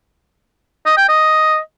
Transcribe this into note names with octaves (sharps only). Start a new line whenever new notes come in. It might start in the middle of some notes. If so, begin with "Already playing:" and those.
D#5
G5
D#5